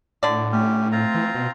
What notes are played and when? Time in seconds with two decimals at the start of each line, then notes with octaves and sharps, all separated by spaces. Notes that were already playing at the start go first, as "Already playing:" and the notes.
0.23 A2 D3 D5
0.52 A3 C#4 G4
0.92 C4 F4 A#5
1.15 E3
1.35 B2